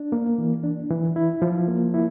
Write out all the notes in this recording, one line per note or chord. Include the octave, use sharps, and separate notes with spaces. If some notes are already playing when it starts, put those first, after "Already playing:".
Already playing: D4
A#3
E3
D4
E3
E4
F3
A#3
E4